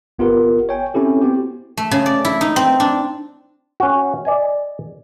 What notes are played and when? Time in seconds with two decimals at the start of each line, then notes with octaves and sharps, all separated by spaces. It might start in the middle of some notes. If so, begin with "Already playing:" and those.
0.19 G1 B3 F4 G4 A#4 F#5
0.69 C#5 G5 G#5
0.94 C4 C#4 E4 G4 A4
1.22 B3 C4 F#4 G4
1.77 A3
1.91 C#3
2.06 D5
2.25 E4
2.41 D#4
2.56 C4
2.80 D4
3.80 C#4 F#4
4.25 D5 D#5 G#5